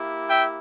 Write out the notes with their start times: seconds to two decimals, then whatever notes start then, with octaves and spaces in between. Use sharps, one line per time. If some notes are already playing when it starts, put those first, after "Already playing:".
Already playing: A#3 E4 G4
0.29 E5 G5